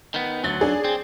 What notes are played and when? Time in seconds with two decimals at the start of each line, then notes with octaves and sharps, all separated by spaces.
0.14 D#3 B3
0.44 D2 F#3 A6
0.61 D4 G#4
0.84 C4